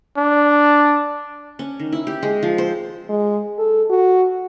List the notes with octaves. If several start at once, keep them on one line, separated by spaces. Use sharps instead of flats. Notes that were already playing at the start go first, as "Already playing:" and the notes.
D4
C#4
D#3
E4
G4
G#3
F3
C5
G#3
A4
F#4